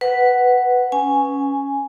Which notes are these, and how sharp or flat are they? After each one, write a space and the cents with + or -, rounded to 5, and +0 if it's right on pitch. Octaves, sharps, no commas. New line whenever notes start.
B4 +0 F#5 +5
C#4 +0 G#5 +0